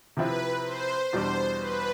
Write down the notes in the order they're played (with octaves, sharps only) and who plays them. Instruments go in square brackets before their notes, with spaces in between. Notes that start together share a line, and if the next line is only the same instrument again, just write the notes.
[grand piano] C3 F3 C4 E4 [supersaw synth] B4
[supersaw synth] C5
[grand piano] E2 B2 G3 D4 [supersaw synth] C5
[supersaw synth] B4